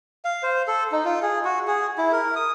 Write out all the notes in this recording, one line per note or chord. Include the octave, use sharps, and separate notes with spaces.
F5
C5
A4
D#4
F4
G#4
F#4
G#4
E4
A#4
D#6